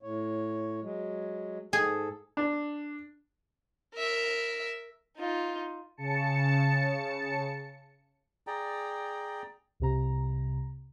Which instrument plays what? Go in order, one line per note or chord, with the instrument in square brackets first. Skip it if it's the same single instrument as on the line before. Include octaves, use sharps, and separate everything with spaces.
[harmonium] A2 C#5
F#3 G#3
[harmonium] G#2 A4 [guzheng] G#4
[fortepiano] D4
[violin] A#4 E5
[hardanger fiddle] D#4 F4
[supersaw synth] C#3 A5 C#7
[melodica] G#4 D5 G5 A#5
[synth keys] C2 C3 A#5